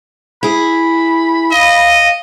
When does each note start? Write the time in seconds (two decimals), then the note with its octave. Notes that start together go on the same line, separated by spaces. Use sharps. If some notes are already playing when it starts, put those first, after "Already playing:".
0.43 E4 G#4 B5
1.52 D#5 F5